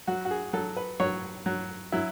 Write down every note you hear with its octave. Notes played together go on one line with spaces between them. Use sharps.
F#3 F#4
F#4
G#4
F#3 A4
B4
F#3 C#5
F#3
F#3 E4